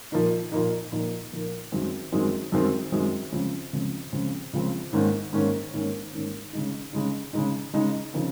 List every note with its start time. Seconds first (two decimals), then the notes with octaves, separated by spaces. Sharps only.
0.12 A#2 F3 A#3 D#4
0.52 A#2 F3 A#3 D#4
0.92 A#2 F3 A#3 D#4
1.32 A#2 F3 A#3 D#4
1.72 F#2 D#3 G#3 C4
2.12 F#2 D#3 G#3 C4
2.52 F#2 D#3 G#3 C4
2.92 F#2 D#3 G#3 C4
3.32 C#2 C#3 F3 C4
3.73 C#2 C#3 F3 C4
4.12 C#2 C#3 F3 C4
4.53 C#2 C#3 F3 C4
4.93 G#2 D#3 A#3 C#4
5.33 G#2 D#3 A#3 C#4
5.73 G#2 D#3 A#3 C#4
6.13 G#2 D#3 A#3 C#4
6.53 C#3 G#3 D#4
6.93 C#3 G#3 D#4
7.33 C#3 G#3 D#4
7.74 C#3 G#3 D#4
8.14 C#3 F3 C4 D#4